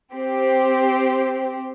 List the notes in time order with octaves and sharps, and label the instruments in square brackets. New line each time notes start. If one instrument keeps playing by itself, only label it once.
[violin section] C4 G4 C5